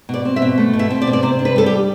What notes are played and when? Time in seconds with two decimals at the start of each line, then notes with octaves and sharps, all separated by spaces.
0.09 B2 D5
0.25 C4
0.36 E5
0.42 B2
0.58 A3
0.73 B2
0.79 E5
0.90 C4
1.02 D5
1.07 B2
1.13 D5
1.22 C3 C5
1.39 D4
1.45 B4
1.56 G3 A4
1.66 G4